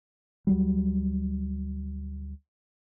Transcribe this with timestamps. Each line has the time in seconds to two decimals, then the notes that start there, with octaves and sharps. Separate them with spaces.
0.47 D2 F#3 G3